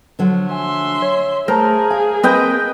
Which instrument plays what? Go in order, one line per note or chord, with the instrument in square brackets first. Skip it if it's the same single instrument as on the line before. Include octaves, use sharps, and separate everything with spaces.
[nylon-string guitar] D3 F3 F#3
[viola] E5 C6 [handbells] G#5
[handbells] C#5
[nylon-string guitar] A3 [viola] G#4 [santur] A#4 [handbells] C5 A5
[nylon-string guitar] F5 [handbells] G#5
[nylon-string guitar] A#3 C4 A#4 [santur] B4 D#5 G5